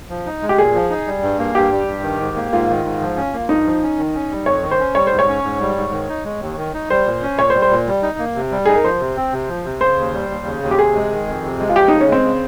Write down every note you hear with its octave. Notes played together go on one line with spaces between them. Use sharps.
F3
D#4
G#3
G4
A#2 G#4
F3
D#4
G3
G2
A#3
G2 G4
G3
G2
D#3
G#2
A#3
G#2 F4
D#3
G#2
F3
C#4
A#3
G2 D#4
F3
C#4
D#3
C#4
G3
F2 C#5
D#3
C5
C#4
G3 C#5
G#2 C5
C#5
C#4
G#2
G3
G#2
D#3
D#4
G#3
D#2
D#3
D#4
G3 C5
A#2
C#4
A#2 C#5
C5
G3
C5
A#2
G3
D#4
A#3
C3
G3
D#4 G#4
A#4
F3 C5
C3
C4
C3
F3
C3
C#3 C5
D#2
G3
D#2
C#3
D#2
G4
C3 G#4
G#3
D#3
F2
C3
G#3
F4
F3 G4
C#3 D#4
C#4
G#3 C4
C#3